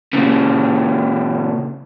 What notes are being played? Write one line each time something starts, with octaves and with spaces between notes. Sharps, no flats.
A#2 C#3